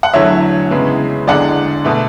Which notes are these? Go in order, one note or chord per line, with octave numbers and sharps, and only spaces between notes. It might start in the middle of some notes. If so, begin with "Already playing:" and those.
F#5
E2 D3 F#3 A3 C#5 E5
E2 C#3 G#3 B3
E2 D3 G#3 D5 F#5
B2 A3